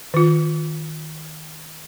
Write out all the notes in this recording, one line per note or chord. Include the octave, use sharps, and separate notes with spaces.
D#3 F4